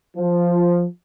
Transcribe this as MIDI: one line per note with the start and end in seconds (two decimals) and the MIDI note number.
0.17 0.83 53